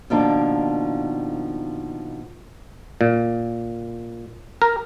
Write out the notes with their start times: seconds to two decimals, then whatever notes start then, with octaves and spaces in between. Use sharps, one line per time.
0.10 B2 D#3 F3 A#3 D4
3.01 A#2
4.62 A#4